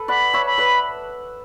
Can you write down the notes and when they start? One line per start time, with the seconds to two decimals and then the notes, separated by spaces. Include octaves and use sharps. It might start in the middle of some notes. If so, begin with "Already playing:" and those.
Already playing: A4 B4
0.08 D5 F#5 B5
0.34 C#5 E5
0.46 B5
0.58 B4 D5